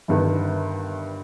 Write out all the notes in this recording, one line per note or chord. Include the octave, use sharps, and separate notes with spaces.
G1 G2 D#3